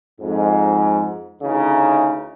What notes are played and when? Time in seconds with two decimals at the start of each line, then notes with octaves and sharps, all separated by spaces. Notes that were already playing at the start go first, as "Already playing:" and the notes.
0.21 F2 G#2
1.42 D2 C#3 E3 D#4